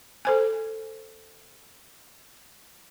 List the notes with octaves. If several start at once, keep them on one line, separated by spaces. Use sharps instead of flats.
A4 C5 G#5